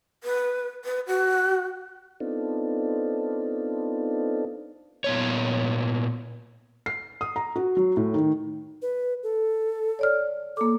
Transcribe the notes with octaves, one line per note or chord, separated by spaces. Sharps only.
B4
B4
F#4
B3 C4 D4 D#4 F4 A4
A#2 B3 C#5
C7
D#6
A#5
F#4
F#3
A2
D#3
B4
A4
C#5 D5 F6
A#3 A4 D6